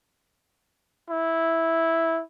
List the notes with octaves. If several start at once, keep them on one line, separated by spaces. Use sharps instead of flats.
E4